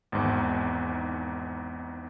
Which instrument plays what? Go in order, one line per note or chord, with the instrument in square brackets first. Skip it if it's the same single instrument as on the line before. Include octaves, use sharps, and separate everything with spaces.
[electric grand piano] G#1 E2 G#2